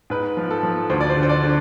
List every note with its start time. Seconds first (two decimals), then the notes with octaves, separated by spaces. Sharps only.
0.10 G#2 B4
0.37 F3
0.50 A4
0.63 F3
0.90 D2 C5
1.01 D5
1.10 C5
1.17 D3
1.23 C5
1.29 D5
1.43 D3